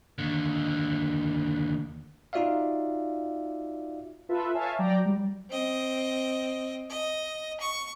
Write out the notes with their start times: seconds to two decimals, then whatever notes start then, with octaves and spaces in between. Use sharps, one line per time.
0.19 D#2 D3
2.33 D#4 F4 F#4 D5 E5 F5
4.29 F4 A4 B4 E5
4.54 C#5 E5 F5 G#5 A5
4.79 F#3 D5 G5 A#5
5.06 G3
5.50 C4 D#5
6.90 D#5
7.61 C#6